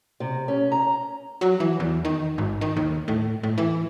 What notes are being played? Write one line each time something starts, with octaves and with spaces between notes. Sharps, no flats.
C3
C#4
A#5
F#3
E3
E2
D#3
G#1
D#3
D#2
A2
A2
E3